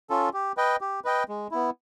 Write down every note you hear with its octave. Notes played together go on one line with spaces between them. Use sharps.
C#4 F4 A4
G4
B4 D#5 G5
G4
B4 D#5 G5
G#3
B3 E4